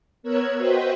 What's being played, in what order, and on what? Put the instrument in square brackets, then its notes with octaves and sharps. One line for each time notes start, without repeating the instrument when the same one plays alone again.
[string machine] B3 A#4 C#5 E6 F#6 G#6
F#4 B4 C5 D#5 E5 G5